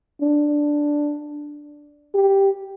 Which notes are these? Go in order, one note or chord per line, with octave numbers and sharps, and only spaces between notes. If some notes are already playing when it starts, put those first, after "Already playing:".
D4
G4